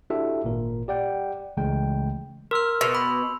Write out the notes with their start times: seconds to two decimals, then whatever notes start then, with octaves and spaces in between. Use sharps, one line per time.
0.10 D4 E4 F#4 G4 A4 E5
0.44 G#1 A#2 A#4
0.88 G4 D5 F#5 G5
1.57 C#2 C#3 E3 G#3 A3 G5
2.51 A#4 C6 E6 F6
2.81 B2 E6 F7
2.95 B5